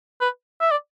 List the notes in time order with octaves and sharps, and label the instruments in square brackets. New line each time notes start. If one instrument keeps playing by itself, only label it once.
[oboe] B4
E5
D5